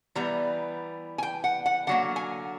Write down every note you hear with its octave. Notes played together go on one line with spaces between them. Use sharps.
E3 G3 B3 A#5
G#5
G5
F#5
F#5
D3 F#3 A#3 F#5
G#5